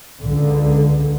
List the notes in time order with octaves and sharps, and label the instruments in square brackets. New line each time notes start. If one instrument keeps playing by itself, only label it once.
[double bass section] C#2 D3